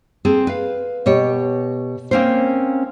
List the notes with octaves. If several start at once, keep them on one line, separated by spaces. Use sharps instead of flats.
C4 G#4 A4
B4 F5
B2 G4 C#5
A#3 C4 C#4 A#4 C5